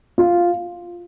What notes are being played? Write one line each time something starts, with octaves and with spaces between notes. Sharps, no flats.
F4